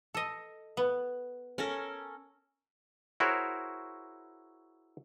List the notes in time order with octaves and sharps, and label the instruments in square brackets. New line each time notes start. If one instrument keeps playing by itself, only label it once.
[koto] A4 D#5
B3
[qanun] C#4 A4 A#4
[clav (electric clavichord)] E4 F#4 G#4 A#4 C5 C#5